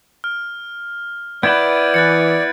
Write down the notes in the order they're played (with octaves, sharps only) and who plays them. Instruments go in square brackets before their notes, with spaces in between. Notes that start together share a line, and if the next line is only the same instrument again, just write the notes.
[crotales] F6
[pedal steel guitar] B3 E4 B4 [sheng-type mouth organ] D5 [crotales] G6 G#6 D7
[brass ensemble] E3 [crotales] F#6 A6 C#7